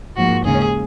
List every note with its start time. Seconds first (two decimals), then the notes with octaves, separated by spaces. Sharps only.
0.17 G#2 F3 A#3 F#4
0.45 D#2 C#3 G#3 C#4 G#4